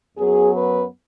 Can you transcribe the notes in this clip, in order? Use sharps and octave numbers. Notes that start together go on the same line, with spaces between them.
F#2 F#3 B3 G#4
B4